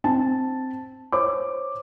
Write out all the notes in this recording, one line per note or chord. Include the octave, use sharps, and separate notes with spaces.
C4 A5
C5 C#5 D6